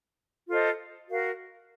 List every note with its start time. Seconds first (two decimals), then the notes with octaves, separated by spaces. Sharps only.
0.48 F4 A4 C5 D#5
1.07 F#4 A#4 F5